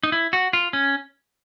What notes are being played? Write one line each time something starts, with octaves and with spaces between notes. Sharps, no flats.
D#4
E4
F#4
F4
C#4